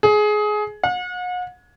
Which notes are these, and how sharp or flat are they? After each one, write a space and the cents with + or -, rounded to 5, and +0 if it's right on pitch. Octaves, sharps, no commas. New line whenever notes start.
G#4 +20
F#5 -40